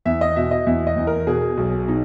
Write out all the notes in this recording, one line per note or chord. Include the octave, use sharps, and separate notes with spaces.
E2 E5
D#5
B2 E5
D#5
E2 E5
D#5
E2
A#4
B2 G#4
B1
B2 D#4